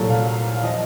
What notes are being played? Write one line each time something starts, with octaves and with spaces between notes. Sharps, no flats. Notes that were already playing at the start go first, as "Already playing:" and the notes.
Already playing: C2 A#2 F#3 A4
F5
F5
F3 D#5